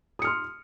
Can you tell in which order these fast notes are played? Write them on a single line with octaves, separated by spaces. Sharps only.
D#6 C#7 F6 C6